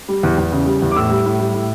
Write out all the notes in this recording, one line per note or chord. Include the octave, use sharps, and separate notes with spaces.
G3
E2
E2
C#3
G3
E2
D6
A2 E6
G3
A2
G3
A2